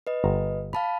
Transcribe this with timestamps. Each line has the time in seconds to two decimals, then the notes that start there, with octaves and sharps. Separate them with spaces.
0.07 B4 D#5
0.24 G1 A#5
0.73 F5 A5 B5